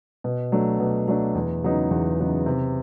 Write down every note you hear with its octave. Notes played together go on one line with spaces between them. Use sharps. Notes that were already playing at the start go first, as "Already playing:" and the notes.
B2
F#3 A3 D4
B2
F#3 A3 D4
E2
C#3 F#3 B3 D#4
E2
C#3 F#3 B3 D#4
C3